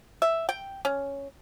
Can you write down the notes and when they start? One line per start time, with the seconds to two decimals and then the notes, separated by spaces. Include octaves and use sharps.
0.22 E5
0.49 G5
0.85 C#4